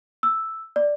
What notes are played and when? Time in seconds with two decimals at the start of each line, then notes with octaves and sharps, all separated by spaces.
0.23 E6
0.76 D5